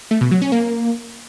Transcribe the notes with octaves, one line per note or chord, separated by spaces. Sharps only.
A3
B2
F#3
C#4
A#3